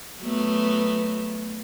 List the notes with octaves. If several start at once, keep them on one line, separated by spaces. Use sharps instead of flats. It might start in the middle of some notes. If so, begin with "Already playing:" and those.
F#3 A3 B3